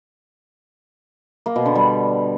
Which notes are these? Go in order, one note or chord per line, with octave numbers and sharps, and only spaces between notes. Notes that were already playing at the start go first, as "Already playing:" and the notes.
A#3
B2
D3
G3